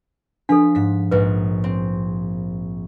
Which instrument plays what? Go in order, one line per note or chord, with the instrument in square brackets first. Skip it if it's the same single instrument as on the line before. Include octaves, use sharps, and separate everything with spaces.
[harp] F3 B6 [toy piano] D4 A4
[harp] G#2 B6
[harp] A#1 G#2 G#3 [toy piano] B4
[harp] C4